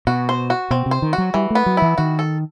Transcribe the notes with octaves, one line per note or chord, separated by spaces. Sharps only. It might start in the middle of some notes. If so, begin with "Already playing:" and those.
B2 F#4
C5
F#4
B2 C4
C3
C5
D#3
F#4
F#3
E3 G3
A3 B3
F#3
E3 E4
D#3 F#4
A4